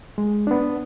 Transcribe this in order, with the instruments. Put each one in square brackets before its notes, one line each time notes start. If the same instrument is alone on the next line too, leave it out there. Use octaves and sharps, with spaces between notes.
[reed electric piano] G#3
B3 D4